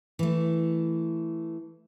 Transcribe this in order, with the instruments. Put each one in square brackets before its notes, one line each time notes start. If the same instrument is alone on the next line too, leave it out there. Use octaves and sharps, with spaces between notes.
[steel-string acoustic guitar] E3 A3